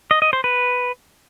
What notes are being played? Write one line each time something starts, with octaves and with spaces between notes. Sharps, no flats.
D#5
D#5
C5
B4